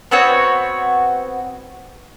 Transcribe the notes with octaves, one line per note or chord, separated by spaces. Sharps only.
B3 C4 F#4 C#5